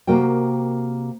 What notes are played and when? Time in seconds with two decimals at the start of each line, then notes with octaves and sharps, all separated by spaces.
0.07 C3 A#3 F#4 A#4 G5